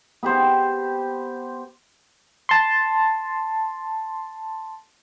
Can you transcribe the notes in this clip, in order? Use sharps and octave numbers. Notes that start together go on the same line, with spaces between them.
B3 G4 C5
A5 C6